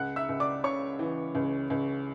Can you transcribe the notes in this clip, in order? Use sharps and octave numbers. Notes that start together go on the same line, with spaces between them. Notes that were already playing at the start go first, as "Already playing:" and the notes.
Already playing: C#2 F#5 F#6
E5 E6
C#2
D5 D6
C#3 C#5 C#6
E3
C#2
C#2